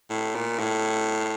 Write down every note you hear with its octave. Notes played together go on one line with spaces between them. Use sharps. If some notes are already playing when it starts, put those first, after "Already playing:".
A2
A#2
A2